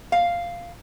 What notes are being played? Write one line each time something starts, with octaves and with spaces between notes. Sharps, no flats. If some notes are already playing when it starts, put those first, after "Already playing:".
F5